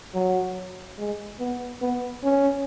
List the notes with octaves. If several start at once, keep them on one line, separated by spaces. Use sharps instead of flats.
F#3
G#3
B3
B3
C#4